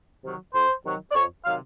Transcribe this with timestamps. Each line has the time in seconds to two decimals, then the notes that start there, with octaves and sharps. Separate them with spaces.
0.23 C3 D#3 F#3
0.54 F2 C5
0.84 C3 D#3 F#3
1.11 D5
1.14 F2 C#5
1.45 C3 D#3 F#3 F5